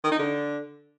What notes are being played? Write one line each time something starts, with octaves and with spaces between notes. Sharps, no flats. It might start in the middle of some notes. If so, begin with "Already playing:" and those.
D#3
D#4
D3